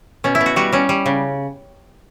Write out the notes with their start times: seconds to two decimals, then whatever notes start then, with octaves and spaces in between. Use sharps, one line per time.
0.24 B2 C#4
0.35 E4
0.41 B2
0.46 F#4
0.56 G3 F#4
0.72 G3 C#4
0.89 G3
1.06 C#3